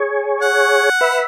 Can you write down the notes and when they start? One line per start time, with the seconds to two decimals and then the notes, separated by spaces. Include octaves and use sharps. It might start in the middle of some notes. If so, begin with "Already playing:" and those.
Already playing: G#4 C#5
0.42 F#5
1.01 B4 E5